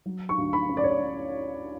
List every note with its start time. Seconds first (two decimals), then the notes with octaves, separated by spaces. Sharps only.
0.06 F#3
0.29 C#6
0.38 D2
0.53 B5
0.69 C#4
0.77 D5
0.84 C#5
0.91 D5
1.00 C#4